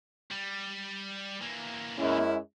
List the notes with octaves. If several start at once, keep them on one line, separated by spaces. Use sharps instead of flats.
G3
E3 A#3
F#2 G#3 C#4 E4